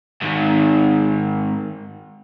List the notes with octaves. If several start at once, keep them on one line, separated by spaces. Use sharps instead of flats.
G#2 D#3